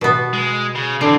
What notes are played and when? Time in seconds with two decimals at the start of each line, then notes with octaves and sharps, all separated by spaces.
0.01 B2 B3
0.33 G#3
0.75 C#3
1.01 D3 E3 C4